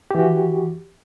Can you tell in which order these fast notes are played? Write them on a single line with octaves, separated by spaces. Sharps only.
G4 E3 F#4